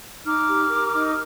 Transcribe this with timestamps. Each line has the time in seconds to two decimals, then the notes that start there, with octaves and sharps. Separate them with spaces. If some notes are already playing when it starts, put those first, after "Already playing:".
0.24 D#4 D6 F6
0.47 G4
0.70 A#4
0.93 D#4